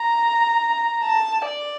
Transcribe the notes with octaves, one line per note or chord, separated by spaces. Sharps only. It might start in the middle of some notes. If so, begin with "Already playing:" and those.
Already playing: A#5
A5
D5